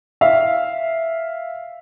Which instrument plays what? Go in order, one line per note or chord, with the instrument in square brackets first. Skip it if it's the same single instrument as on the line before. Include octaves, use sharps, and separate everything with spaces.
[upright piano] E5 F5